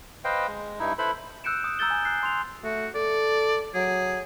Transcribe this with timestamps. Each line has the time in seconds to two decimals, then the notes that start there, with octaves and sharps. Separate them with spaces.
0.24 B4 C5 D#5 F5 G5
0.47 G#3
0.79 G2 D#4 E4
0.98 E4 A4 B4 C5 B5
1.44 E6 F#6 G6 C#7 D7 E7
1.64 D#6
1.79 A#5 E6 G6 A6 G7
1.90 G#5 E6 G#6 A6
2.05 F#6 C7
2.23 C6 F7
2.64 A3 F#4
2.95 A4 D5
3.74 F#3 G#4